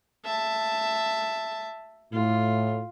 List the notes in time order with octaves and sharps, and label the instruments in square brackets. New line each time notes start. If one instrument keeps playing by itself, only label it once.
[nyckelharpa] E5 A5
[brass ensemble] A2 [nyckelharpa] F4